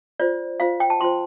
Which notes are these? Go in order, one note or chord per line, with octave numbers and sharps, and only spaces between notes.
F4 C5 D5
F4 C5 F5
G5
A5
F4 C5 C6